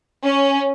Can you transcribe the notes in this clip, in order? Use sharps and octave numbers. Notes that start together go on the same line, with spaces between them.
C#4